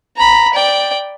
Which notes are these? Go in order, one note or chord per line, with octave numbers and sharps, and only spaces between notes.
A#5 B5
D5 G5